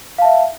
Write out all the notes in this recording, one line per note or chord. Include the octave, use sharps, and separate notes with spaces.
E5 F5 A5